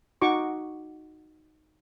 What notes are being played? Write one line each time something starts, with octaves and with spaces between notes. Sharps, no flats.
D#4 F#4 C#6 D6